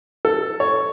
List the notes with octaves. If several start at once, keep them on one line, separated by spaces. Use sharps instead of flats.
A4
C#5